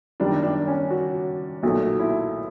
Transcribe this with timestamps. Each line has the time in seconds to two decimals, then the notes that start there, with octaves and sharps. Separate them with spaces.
0.20 F#2 D#3 G3 D4
0.43 D4
0.67 C#4
0.91 F#4
1.63 B1 A#2 F#3 A3 F#4
1.99 E4